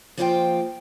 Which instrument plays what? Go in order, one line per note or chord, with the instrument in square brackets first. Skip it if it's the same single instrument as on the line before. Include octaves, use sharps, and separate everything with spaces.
[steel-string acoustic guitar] F3 A#3 F4 C5 F5 G5